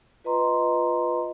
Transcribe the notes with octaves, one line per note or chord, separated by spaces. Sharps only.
F4 B4 D#5 A#5 C6